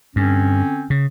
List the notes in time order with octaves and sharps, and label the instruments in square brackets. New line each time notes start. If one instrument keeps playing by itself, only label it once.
[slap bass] G2 [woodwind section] D3 C4 C#4
[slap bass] C#3